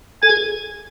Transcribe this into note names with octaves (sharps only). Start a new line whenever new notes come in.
A4 G#5
G#4